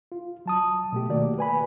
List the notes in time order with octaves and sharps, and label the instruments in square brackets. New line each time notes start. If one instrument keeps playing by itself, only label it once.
[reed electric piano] F4
F#3 A5 D#6
B2 A3 G4
D#3 A3 A#3 F#4 D5
B4 G#5 B5